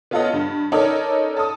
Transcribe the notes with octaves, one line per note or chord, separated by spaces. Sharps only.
B3 C#4 F4 A4 D#5 F#5
G2
C#4 D#4 A4 A#4 C#5 D5
A4 D#6